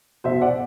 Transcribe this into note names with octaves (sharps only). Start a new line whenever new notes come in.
B2 C5 E5
D5 F#5